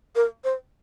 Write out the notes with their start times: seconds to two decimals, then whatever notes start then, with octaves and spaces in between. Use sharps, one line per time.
0.16 A#4
0.44 C5